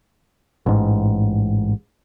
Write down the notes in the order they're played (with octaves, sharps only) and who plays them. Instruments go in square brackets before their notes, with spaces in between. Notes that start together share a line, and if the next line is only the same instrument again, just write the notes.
[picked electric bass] A1 G#2